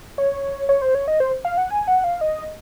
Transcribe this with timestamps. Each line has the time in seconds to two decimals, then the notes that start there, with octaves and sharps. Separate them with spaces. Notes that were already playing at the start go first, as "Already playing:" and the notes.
0.18 C#5
0.69 C#5
0.82 C5
0.95 C#5
1.08 D#5
1.20 C5
1.45 F5
1.57 F#5
1.70 G#5
1.88 F#5
2.04 F5
2.21 D#5